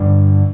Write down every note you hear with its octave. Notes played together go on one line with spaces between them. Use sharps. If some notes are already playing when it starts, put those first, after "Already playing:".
Already playing: G2 D3